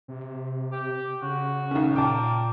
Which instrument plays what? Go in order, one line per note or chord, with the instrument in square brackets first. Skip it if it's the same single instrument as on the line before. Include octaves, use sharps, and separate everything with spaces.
[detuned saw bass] C3
[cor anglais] G4
[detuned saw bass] C#3 [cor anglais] F#4
[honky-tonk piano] B1 D#3 [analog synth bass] C#4
[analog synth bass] A#2 [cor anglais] A#3 [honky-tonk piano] G5 A5